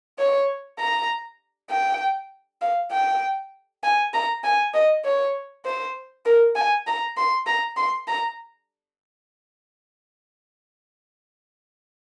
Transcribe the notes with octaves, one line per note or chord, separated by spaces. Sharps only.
C#5
A#5
G5
F5
G5
G#5
A#5
G#5
D#5
C#5
C5
A#4
G#5
A#5
C6
A#5
C6
A#5